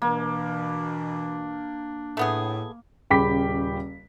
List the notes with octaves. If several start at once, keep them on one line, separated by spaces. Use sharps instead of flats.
B2 E3 A#3 D4
A2 A3 B3 G#4
D#1 C#3 G5 B5 D6 B6